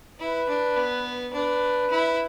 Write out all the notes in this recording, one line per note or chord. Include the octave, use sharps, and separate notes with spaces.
E4 B4
D4
B3
D4 B4
E4